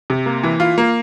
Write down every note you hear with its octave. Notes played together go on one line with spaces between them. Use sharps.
C3
A#3
E3
F4
A#3